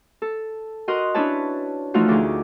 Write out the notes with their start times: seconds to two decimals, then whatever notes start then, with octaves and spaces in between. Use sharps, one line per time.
0.22 A4
0.88 F#4 A#4 D#5 C6 D#6 F#6
1.14 C#4 D4 E4 B4 C#5 A5
1.94 E3 F3 A3 D#4 F4 F#4
2.08 D2 D4 D#4 G#4 D6